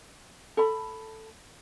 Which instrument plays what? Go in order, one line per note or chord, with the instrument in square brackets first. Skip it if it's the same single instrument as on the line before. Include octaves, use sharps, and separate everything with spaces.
[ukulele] A4 B5